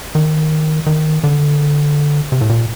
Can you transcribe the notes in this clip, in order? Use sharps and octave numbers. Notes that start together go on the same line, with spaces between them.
D#3
D#3
D3
C3
A2
A#2